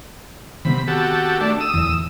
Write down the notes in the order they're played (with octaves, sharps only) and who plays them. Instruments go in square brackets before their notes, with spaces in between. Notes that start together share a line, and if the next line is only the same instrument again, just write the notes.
[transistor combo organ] C3 B5 [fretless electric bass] D#3 B3 C4
[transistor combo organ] F#4 G4 A4
A3 D4
D#6 E6
[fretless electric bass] D1 E2 E3